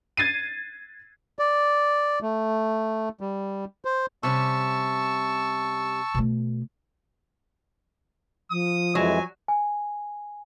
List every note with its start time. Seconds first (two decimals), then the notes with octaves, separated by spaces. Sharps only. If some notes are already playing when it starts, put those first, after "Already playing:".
0.17 G#6 A6 C7 D#7
1.39 D5
2.22 A3
3.21 G3
3.85 C5
4.23 C3 G3 C#4 A5 C#6 E6
6.14 B2 A3
8.51 F3 D#6
8.95 F2 E3 F#3 G#3 G#5
9.48 G#5